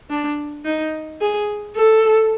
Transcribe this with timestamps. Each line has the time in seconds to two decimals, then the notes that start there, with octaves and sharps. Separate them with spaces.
0.10 D4
0.65 D#4
1.21 G#4
1.76 A4